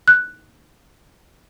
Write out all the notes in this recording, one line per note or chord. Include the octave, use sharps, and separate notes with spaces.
F#6